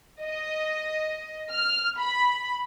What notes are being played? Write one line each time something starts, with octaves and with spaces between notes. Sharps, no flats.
D#5
F6
B5